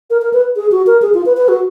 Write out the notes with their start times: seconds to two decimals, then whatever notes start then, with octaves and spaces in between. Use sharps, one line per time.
0.10 A#4
0.22 A#4
0.33 B4
0.56 G#4
0.71 F#4
0.87 A#4
1.02 G#4
1.14 F4
1.26 B4
1.37 B4
1.48 F#4